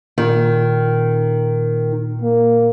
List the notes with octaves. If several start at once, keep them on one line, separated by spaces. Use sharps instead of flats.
A#2 D#3
A#3